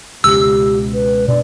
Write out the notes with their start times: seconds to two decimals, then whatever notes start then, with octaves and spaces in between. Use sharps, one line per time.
0.24 C#2 B2 G4 E6
0.94 B4
1.28 B2 D4 D5